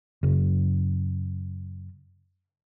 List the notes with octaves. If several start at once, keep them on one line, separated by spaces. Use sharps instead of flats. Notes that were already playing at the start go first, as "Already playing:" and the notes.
F#2 C#3